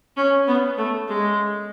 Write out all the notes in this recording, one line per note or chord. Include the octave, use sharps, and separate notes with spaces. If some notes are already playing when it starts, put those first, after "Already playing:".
C#4
B3
A3
G#3